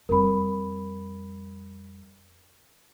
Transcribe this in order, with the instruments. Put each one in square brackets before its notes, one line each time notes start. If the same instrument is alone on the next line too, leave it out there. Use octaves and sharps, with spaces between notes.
[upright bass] F2 G3 [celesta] A#4 B5